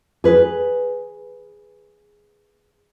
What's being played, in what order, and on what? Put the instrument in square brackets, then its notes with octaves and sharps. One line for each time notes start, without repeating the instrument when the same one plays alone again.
[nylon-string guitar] G#4 B4